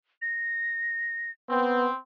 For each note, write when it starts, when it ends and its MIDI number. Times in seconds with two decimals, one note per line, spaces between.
0.22 1.31 94
1.49 1.87 59
1.49 1.97 60